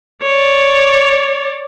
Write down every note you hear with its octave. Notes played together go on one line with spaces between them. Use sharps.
C#5 D5